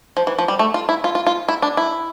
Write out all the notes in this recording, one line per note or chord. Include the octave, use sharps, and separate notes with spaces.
F3
E3
F3
G3
A3
F4
E4
F4
F4
F4
E4
D4
E4